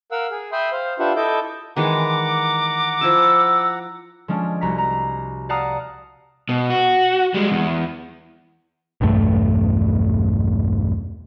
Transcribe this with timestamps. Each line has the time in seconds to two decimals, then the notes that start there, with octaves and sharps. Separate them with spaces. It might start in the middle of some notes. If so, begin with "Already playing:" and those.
0.12 A#4 F5 F#5 E6
0.31 G#4
0.52 E5 G5 B5 C6 D#6
0.72 C5 F5
0.99 D4 F4 G4 B4 E5 F#5
1.16 E4 A4 D#5 E5 D6 G6
1.77 D#3 E3 G#3 F#5 A#5 D6
3.01 F3 E4 A5 E6
4.28 F3 G#3 C#4 D4
4.61 C2 F#4 A#5 B6
4.78 A#5
5.49 D5 F5 F#5 A5 A#5 D#6
6.49 B2
6.70 F#4
7.34 G3 G#3
7.52 E2
9.01 B1 E2 G2 A3